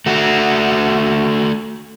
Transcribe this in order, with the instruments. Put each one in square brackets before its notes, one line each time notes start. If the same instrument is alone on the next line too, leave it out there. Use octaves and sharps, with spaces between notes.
[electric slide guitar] A3 F#4